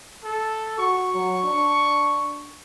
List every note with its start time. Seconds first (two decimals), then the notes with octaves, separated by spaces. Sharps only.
0.24 A4
0.78 F#4 C#6
1.14 F#3
1.44 D4